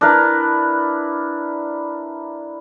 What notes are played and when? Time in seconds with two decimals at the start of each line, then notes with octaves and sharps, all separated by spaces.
0.01 D4 E4 A#4 B4